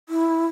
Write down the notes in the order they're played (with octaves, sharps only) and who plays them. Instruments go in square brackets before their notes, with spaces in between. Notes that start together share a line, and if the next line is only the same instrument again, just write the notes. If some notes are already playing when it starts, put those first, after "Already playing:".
[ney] E4